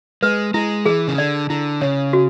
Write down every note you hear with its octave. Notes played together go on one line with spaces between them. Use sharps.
G#3 B4
G#3 E4
E3 G#4
C#3
D3 D5
D3 E4
C#3 C#5
F#4